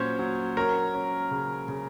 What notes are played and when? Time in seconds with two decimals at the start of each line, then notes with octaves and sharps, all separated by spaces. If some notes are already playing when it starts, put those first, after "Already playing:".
Already playing: A#2 F#3 C#4 C5 C#5
0.19 F#3
0.57 C#4 A#4
0.94 C#4
1.31 C#3
1.69 C#3